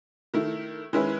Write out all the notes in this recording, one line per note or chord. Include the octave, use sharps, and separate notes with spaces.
D#3 A3 E4
D#3 G#3 C#4 E4 B4